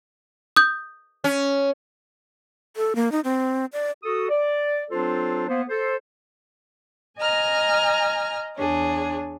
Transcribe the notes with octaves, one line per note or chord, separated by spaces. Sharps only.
D#6 G6
C#4
A4
A#3
D#4
C4
D5
F#4 A4 D#6
D5
F#3 C4 D4 F4 A4 C5
A#3 B3 C5
A4 C5
D#5 G#5 A#5 F6
E2 D4 G#4 C#5